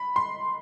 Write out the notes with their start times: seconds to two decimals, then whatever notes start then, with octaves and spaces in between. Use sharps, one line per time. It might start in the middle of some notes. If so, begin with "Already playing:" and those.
Already playing: B5
0.16 C6